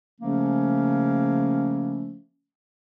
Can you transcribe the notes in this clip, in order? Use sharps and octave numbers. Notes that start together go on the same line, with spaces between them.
C#3 F3 A3 A#3 C#4